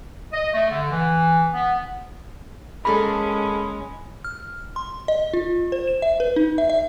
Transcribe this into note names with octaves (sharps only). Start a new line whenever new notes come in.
D#5
A3
D3
E3
B3
G#3 A#3 C#4 G#4 A4 B5
F6
C6
D#5
F4
C5
E7
E5
B4
D#4
E5
E5